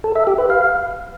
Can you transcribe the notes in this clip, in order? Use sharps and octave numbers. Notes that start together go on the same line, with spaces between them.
A4
E5
G4
B4
F5